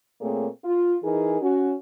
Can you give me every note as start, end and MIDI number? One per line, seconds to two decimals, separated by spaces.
0.21 0.47 46
0.21 0.47 57
0.21 0.47 58
0.21 0.47 60
0.21 0.47 68
0.21 0.47 73
0.64 0.95 65
1.04 1.38 52
1.04 1.38 63
1.04 1.38 68
1.04 1.38 70
1.41 1.74 61
1.41 1.74 66